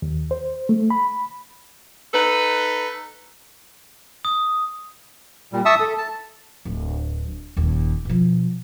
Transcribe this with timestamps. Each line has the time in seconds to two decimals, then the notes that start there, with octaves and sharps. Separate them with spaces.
0.02 D#2
0.31 C5
0.69 A3
0.90 B5
2.13 D#4 A4 B4
4.25 D#6
5.53 A#2 G3
5.65 E5 A5 C#6 D#6 E6
5.80 A4
5.98 A5
6.65 D1
7.57 D#1 D#2
8.05 B2 F3